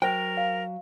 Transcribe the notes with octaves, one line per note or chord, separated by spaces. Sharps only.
F#3 A#4 C5 G5
F5